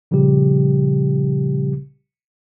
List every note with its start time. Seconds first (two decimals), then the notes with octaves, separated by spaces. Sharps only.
0.11 A#2 C#3 F3 G3 G4